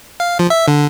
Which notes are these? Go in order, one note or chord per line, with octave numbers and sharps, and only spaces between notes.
F5
F3
E5
D3